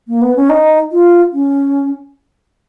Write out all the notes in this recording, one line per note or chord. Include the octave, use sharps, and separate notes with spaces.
A#3
B3
C#4
D#4
F4
C#4